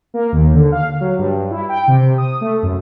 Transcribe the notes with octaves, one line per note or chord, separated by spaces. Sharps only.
A#3
D#2
D3
F5
F#3
G2
E4
G5
C3
D#6
A3
F#2